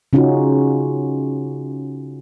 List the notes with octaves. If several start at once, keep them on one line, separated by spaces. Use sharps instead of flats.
C#3 C#4 D#4 F4 F#4